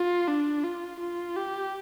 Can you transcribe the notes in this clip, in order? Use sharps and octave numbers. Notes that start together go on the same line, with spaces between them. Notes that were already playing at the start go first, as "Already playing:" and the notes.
Already playing: F4
D4
F4
F4
G4